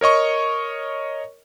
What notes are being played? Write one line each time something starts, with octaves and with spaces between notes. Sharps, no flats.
A#4 C#5 D#5 C#6